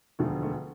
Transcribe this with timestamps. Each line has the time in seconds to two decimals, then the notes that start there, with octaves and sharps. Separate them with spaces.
0.19 E1 D2 D3 F3 A3
0.43 A3